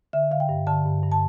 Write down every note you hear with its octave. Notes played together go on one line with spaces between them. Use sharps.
D3 E5
D3 F5
G5
G2
D3 A5
G2
G2
A5